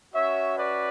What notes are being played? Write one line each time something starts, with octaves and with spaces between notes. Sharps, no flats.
C#4 F#4 C#5 E5
B4 D5